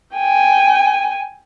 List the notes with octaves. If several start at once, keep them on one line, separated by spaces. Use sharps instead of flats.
G5 G#5